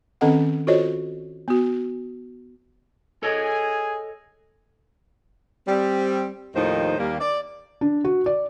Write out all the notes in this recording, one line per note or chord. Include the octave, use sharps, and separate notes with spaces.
D#3 C4 C#4 A4 D#5 F#5
F4 F#4 A4 C5 C#5 D#5
B3 F#4
G#4 A4 C#5 D#5 G#5
G3 C4
D#2 A2 D#3 F3 D#4 C5
D#2 G3 A#3
D5
D4
F#4
D5